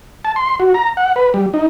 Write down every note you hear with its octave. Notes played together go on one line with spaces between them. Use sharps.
A5
C6
F#4
A#5
F#5
B4
G3
D#4